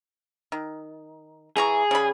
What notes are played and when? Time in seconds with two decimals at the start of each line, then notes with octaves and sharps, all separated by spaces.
0.52 D#3
1.57 E3 G#4 A#5 C#6
1.91 C#3 G3 B5